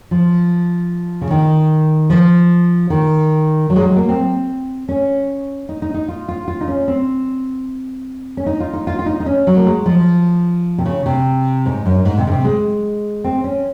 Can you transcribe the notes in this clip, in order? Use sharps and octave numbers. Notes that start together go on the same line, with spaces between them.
F3
C#3
D#3
F3
D#3
F#3
G#3
F#3
A#3
C4
C#4
D#4
D#4
D#4
F4
F4
F4
D#4
C#4
C4
C#4
D#4
F4
D#4
F4
F4
D#4
D#4
C#4
F#3
A#3
G#3
F3
C3
C#3
C3
G#2
F#2
G#2
C3
C#3
C3
G#3
C4
C#4